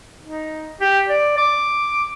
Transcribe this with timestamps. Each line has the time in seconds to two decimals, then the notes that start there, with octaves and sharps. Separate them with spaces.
0.23 D#4
0.81 G4
1.08 D5
1.38 D6